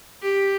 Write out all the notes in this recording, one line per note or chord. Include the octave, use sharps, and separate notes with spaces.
G4